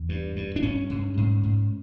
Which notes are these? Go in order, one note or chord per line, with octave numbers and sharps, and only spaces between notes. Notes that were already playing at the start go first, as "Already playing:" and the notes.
Already playing: E2
G2
G2
D4
G2 C#4
G2
G#2
G#2